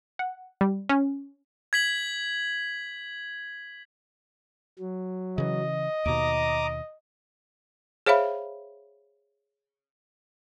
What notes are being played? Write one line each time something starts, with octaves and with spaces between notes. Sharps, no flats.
F#5
G3
C#4
G#6 B6 F#7
F#3
C#3 E3 D#5
D#2 B2 A#5 D6 D#6
G#4 C5 C#5 E5 F5 B5